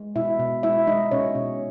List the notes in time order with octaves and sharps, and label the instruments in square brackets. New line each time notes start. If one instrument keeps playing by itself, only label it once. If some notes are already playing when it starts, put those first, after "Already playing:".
Already playing: [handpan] G#3
B2 E4 E5
B2
G#3 E4 E5
G#3 D#4 D#5
B2 C#4 C#5
B2